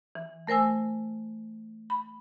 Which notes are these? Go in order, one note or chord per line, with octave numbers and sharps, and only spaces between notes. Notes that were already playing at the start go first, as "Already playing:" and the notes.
E3
A3 A#4 C5 G#5 E6
B5